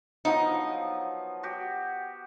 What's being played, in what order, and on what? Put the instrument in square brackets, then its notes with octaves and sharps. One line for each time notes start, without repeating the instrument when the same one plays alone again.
[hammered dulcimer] F3 F#3 B3 [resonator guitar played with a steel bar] D#4
[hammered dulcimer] F#4 G4